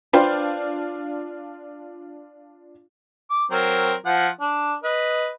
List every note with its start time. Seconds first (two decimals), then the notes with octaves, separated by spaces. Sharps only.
0.13 D4 F4 B4 C5 G5
3.30 D6
3.51 F#3 C4 A#4
4.05 F3 F#5
4.41 D4
4.84 B4 D#5